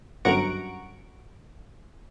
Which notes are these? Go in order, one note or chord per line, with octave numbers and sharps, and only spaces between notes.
G1 F#2 F#5 A#5 C#6 D7